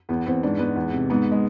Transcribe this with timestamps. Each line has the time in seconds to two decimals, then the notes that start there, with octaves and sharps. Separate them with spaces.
0.09 E2 B3
0.26 E2 C4
0.43 G#2 D4
0.59 G#2 B3
0.76 E2
0.93 C3
1.10 G#2 B3
1.32 G#3